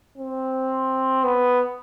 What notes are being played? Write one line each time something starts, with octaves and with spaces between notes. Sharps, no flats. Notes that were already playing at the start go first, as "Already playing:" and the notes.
C4
B3